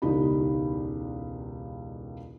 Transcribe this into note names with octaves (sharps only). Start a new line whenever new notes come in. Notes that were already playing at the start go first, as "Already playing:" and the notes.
E1 C#2 D4 D#4 G4 B5